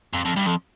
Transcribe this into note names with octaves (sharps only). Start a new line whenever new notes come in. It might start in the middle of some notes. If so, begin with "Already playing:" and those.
F2
F2
G2
F2